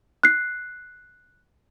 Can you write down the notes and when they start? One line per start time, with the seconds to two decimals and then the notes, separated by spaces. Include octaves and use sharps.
0.23 F#6 C7